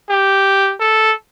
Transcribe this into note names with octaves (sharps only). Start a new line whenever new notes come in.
G4
A4